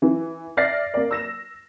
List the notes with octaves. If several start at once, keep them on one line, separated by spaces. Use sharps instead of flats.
E3
D5 E5 F6 A6 A#6 C7
A#3 D5
E6 A#6 E7